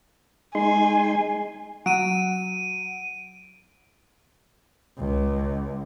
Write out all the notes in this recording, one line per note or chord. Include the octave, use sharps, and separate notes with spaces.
G#3 D#4 G#5 C6
F#3 D7 D#7
C#2